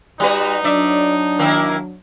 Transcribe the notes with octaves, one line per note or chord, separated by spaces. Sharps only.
G3 D#4 F#4 B4 D5
F#3 D4 D5 E5
D#3 A#3 E4